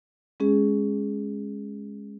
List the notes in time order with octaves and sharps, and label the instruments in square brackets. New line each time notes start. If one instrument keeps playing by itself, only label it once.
[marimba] G#3 C#4 G#4